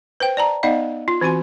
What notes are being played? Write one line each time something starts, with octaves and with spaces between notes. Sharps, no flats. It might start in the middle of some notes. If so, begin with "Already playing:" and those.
B4 C5 G5
D5 A5 A#5
B3 D#4 D5 D#5 F5
F4
E3 C4 F#4 G#5 C6